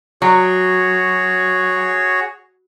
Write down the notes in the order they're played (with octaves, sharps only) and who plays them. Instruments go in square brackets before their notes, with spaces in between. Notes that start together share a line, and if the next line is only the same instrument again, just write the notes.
[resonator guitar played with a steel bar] F#3 [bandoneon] F#4 G#4 C#5